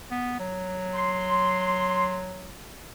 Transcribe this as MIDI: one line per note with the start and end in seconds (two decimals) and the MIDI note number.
0.11 0.36 59
0.40 2.72 54
0.94 2.16 84